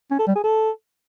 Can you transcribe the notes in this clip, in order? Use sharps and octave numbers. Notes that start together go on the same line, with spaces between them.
C#4
A4
G3
G#4
A4